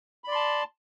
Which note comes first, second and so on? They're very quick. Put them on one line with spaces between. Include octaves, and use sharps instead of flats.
B5 D5 C6 A5